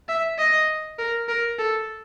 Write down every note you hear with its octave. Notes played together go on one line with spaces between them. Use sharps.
E5
D#5
A#4
A#4
A4